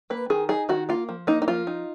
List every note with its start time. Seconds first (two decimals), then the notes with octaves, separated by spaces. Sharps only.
0.10 A#3 B4
0.30 D#3 G#4
0.49 D#4 G#4
0.69 D#3 F#4
0.89 A#3 F4
1.09 F3
1.27 A#3 D#4
1.42 D#4
1.48 F3 F4
1.67 D#4